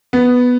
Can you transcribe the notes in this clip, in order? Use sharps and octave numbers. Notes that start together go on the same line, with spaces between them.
B3